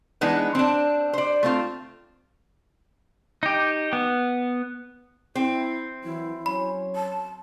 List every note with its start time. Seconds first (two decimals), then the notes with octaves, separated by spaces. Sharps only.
0.21 E3 G#3 B3 D4 D#4
0.55 C4 D4
1.13 C5 D5
1.43 A3 C4 F4
3.43 D#4 G4
3.93 B3
5.35 C4 E4
6.04 E3 F#3 E4
6.46 F#3 C#4 C#5 B5
6.95 A5